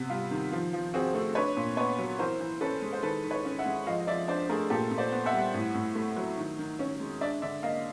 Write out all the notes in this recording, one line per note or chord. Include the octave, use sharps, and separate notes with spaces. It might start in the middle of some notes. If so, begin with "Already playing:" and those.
Already playing: C3 B3
G3 F4
D#3
F3
F3
C4 F#4 G#4
A3
D4 B4 C#5
A#2
B3 B4 C#5
F#3
E3 A#4 C5
E3
C#4 A4 B4
G#3
C5
D#3 A4 B4
D#3
B4 C#5
C#4
E5 F#5
G#3
F3 D#5 F5
D#5
F3 D5 E5
D4 C5 D5
A3 G#4 A#4
A#2 G4 A4
A#2
C5 D5
B3
E5 F#5
G3
A2
A2
A3
F#3
D#3
D#3
C#4
G#3
D4 D5 E5
D3 D5 E5
A#3 D#5 F5